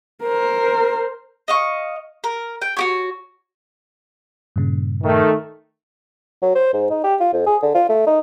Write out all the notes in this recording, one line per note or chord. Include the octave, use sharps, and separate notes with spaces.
A#4 C5
D#5 F5 C#6
A#4
G5
F#4 G4 C#5
G2 A#2 C#3
D#3 A3
F#3
C5
G#2
D#4
G4
F4
F2
G#4
D3
F4
A3
D#4